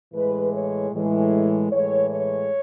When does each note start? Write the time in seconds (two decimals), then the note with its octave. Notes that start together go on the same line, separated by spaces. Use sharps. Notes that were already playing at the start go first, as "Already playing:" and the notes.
0.13 A2 E3 G#3 B4
0.52 C#5
0.92 A2 E3 G#3
1.71 A2 E3 G#3 C#5
2.10 C#5